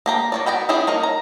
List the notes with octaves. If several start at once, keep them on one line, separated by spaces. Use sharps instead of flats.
A#3 G4 A#5
A#3 C#5 D5
B3 F#4 G5 B5
C#4 E4 F4 G4 G#4
A#3 D#4 A#4 C#5
A#5